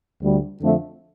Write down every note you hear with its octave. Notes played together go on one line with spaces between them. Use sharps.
D2 D3 G3
F2 D3 F3 A3 D4